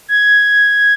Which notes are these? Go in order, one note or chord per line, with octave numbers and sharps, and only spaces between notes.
G#6